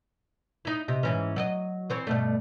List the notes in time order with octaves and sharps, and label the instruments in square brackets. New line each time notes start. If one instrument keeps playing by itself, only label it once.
[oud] D#4 E4
C3 G4 D#5
G#2 E3 C#4
F#3 D5 D#5
E3 C4 C#5
G2 B2 A3